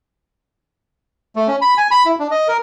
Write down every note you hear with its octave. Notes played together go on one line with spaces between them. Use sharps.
A3
C#4
B5
G#5
B5
E4
D4
D#5
A#4